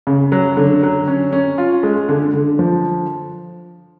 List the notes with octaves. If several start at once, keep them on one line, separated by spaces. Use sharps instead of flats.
C#3
F#3
D3
F#3
C#4
C#4
F4
G#3
D3
D3
F3